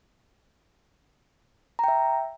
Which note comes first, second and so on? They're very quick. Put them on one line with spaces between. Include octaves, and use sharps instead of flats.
A#5 G5 E5